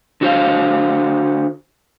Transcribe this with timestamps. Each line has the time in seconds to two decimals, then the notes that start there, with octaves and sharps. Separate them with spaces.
0.21 D3 F#4 C5 F5